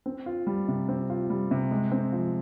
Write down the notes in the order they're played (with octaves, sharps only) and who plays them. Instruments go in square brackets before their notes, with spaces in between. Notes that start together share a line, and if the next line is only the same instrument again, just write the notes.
[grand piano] C4
F4
G3
C3
C4
F4
G3
C3
G#3
C4
F3